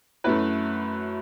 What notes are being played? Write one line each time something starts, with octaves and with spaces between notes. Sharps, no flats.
F#2 F#3 A3 E4 B4